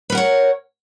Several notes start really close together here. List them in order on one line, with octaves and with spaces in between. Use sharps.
B4 A#4 F#5 C#5